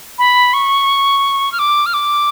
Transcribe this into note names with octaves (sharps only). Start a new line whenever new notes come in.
B5
C#6
F6
D6
F6
D6